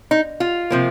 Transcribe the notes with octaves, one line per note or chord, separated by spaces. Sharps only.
D#4
F4
C3 F3 A#3